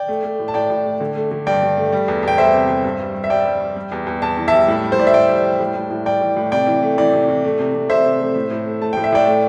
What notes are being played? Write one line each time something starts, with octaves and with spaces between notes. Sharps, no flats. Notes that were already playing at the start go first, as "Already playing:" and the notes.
Already playing: D5 G5
A3
A3
A2
A5
A2 D5 G5
A2
A3
D3
A3
D3
G2 D5 G5
G2
A3
G3
E2
E2 G5
G3 C5 E5
C3
E2
G2
G3
G3
E5
G3 D5 G5
G3
G3
G3
E2
E2
E2 A5
E3
E5 A5
G3
A2
G3
C5
A2 D5
E5
G3 D5 G5
G3
G3
A2
A2
A2
G3 D5 G5
E3
A2
C3 D5 G5
E3
A3
E3 D5
C3
E3
A3
C3
C3
C3 C5 E5
C3
A3
A2
A2
A3
A3 A5
A2 G5
E5
A2 D5 G5
A3